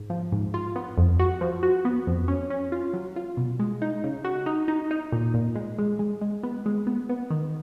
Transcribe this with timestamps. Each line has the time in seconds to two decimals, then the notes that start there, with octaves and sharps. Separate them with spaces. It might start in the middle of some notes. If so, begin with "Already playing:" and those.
Already playing: G#2
0.10 F3
0.32 G#2
0.54 F4
0.76 B3
0.98 F2
1.19 F#4
1.41 F3
1.63 F#4
1.85 B3
2.07 F2
2.28 C#4
2.50 C#4
2.72 F4
2.93 F#3
3.16 F4
3.37 B2
3.59 G#3
3.82 D#4
4.04 C#3
4.25 F#4
4.46 D#4
4.68 D#4
4.91 D#4
5.12 A#2
5.34 A#2
5.55 G#3
5.78 G#3
5.99 G#3
6.21 G#3
6.43 B3
6.66 G#3
6.87 B3
7.09 B3
7.30 D#3